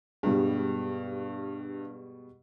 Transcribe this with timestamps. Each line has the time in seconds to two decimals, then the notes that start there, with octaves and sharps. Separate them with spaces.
0.23 G2 B2 G3 G#3